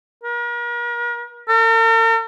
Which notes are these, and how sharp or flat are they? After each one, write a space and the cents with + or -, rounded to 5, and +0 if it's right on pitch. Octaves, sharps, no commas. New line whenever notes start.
A#4 +40
A#4 -45